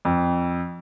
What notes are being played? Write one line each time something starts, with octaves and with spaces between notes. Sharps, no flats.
F2